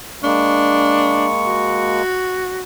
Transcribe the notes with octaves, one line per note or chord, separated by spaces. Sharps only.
G#3 A#3 D4 C#6
F#4